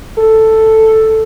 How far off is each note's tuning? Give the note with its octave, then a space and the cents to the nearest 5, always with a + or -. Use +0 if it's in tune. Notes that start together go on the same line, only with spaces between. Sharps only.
A4 +5